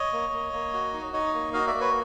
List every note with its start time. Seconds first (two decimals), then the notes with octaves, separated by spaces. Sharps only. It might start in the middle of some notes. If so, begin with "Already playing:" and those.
Already playing: C#5 D#5
0.13 A#3
0.33 A#3
0.53 A#3
0.74 F#4
0.93 D#4
1.13 D#4 C#5 D#5
1.34 A#3
1.53 F#4 D#5 F5
1.67 D5 E5
1.74 A#3
1.81 B4 C#5